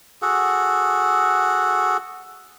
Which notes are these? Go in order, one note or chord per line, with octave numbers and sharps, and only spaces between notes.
F#4 G#4 A4 F#5